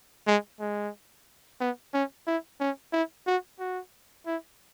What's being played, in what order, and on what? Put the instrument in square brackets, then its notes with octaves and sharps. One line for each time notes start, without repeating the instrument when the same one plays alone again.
[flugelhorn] G#3
G#3
B3
C#4
E4
C#4
E4
F#4
F#4
E4